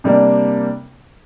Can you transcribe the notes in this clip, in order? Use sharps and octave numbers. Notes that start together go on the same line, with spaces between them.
C3 G3 A#3 D4